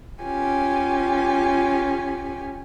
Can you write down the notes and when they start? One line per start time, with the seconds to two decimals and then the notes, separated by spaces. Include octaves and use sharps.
0.23 C#4 F4 G4 G#5